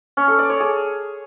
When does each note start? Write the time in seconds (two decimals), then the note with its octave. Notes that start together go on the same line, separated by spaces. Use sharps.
0.17 C#4
0.28 A4
0.39 D5
0.49 C#5
0.60 G#4